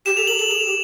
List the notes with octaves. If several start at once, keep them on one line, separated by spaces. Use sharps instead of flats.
G4 E7
A4 F7
A#4 F#7
A4 F#7
G#4 F7
G4